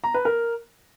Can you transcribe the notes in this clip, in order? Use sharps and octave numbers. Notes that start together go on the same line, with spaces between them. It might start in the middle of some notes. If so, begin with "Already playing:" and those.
A#5
B4
A#4